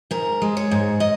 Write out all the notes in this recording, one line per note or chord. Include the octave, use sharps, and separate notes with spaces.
G#2 A#4
G#3
C#5
G#2
D#5